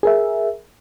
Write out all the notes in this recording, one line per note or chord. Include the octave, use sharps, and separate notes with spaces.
G#4 A#4 E5